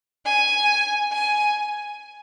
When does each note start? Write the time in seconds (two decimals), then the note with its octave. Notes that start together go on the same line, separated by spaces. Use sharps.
0.26 G#5
1.12 G#5